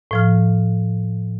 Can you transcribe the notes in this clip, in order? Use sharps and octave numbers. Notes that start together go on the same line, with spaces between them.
A2 F3 F6